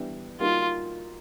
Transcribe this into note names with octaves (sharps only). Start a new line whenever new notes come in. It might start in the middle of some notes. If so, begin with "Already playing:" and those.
Already playing: E3 G3 B3 D4
G3 A#3 D#4 F4 F#4